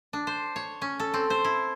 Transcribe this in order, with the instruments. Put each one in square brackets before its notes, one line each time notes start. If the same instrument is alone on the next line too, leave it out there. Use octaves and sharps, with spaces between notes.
[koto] D4
C5
C#5
C#4
A4
C4
C5
E4